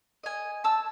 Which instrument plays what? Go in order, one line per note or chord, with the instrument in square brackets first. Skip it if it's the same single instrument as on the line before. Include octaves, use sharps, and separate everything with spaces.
[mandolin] D#5 G#5
A5 E6